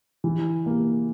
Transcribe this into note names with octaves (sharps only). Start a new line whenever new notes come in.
E3
A#3